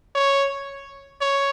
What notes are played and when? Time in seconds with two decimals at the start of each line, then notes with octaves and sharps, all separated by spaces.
0.15 C#5
1.21 C#5